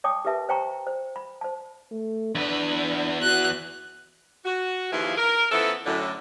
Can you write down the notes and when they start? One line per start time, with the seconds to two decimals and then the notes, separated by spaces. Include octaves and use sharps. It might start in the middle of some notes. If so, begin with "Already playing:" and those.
0.04 C#5 G5 A5 D6 D#6
0.25 G4 A#4 B4 E5 A5
0.49 C5 C#5 G5 A5 A#5 C#6
0.87 C5
1.16 B5
1.41 C5 A5
1.91 A3
2.35 E2 D4 B4
3.22 F#4 F#6
4.45 F#4
4.92 D#2 E3 F3 E4 F4 G#4
5.18 A#4
5.51 E3 F3 B3 C#4 A4
5.86 F#2 A2 D3